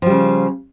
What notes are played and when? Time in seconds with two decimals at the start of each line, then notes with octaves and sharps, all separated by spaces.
0.02 F3
0.06 G3
0.10 C#3